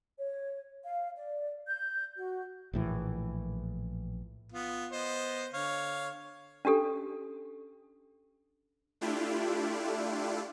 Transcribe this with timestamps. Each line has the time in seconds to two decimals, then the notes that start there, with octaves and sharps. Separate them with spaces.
0.17 C#5
0.83 F5
1.16 D5
1.67 G6
2.16 F#4
2.73 A#1 A2 E3
4.52 B3 F4
4.92 B3 C5 D#5
5.54 D3 C#5 F5
6.65 C#4 D4 G4 A4
9.01 A3 D4 E4 F4 G4